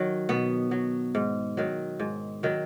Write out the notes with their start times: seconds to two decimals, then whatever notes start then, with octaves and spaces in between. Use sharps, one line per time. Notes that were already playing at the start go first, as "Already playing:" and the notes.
Already playing: D#3 F#3
0.29 B2 B3
0.71 F#3
1.15 G#2
1.57 D#3 F#3
1.99 G#2
2.43 D#3 F#3